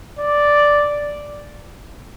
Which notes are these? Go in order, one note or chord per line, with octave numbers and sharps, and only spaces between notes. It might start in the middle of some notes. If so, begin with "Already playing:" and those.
D5